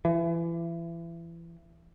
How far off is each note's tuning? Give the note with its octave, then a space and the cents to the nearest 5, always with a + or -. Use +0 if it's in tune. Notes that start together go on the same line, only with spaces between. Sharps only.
E3 +30